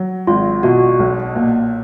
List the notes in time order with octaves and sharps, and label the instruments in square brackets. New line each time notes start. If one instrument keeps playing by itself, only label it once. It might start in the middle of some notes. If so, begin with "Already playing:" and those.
Already playing: [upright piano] F#3
[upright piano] G#1 [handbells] F4
[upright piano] B2 [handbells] F#4
[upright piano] B1
A#2